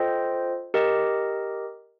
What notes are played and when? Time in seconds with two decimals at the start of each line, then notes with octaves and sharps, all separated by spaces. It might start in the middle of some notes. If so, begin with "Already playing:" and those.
Already playing: F4 A4 C5 D#5 G5
0.74 G4 A#4 D#5